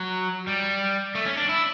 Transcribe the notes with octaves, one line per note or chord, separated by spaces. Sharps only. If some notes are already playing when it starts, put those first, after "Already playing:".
Already playing: F#3
G3
A3
C#4
D4
E4